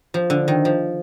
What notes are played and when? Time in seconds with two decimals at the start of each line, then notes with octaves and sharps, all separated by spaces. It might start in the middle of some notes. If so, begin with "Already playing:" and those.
0.14 F3
0.30 D3
0.48 D#3
0.65 F3